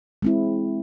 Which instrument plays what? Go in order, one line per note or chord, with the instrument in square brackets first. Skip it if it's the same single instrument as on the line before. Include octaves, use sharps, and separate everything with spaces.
[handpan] G#3 C4 E4